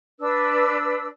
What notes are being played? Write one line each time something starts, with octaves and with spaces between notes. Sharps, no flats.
D4 B4 E6